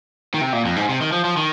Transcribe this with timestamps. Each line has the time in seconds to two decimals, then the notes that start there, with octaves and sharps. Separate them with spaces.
0.34 D#3
0.41 C3
0.53 A#2
0.65 F2
0.76 G#2
0.89 C3
1.01 D#3
1.12 F3
1.25 F3
1.37 D#3